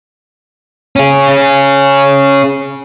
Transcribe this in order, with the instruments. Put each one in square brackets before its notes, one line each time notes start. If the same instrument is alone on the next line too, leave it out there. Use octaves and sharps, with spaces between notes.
[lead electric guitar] C#4 G#4